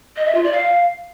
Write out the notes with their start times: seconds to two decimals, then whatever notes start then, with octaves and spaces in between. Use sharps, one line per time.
0.17 D#5
0.26 E5
0.35 F4
0.44 D5
0.53 F5